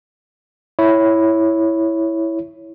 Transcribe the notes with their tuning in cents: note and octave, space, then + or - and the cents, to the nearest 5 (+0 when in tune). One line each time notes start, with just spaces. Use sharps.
E4 +0 C#5 +0